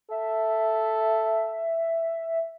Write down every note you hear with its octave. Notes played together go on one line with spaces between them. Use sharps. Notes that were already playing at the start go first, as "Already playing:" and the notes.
A4 E5